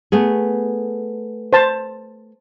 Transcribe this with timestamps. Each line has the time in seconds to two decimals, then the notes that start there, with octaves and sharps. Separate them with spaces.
0.12 A3 B3 G#4
1.53 C5 A5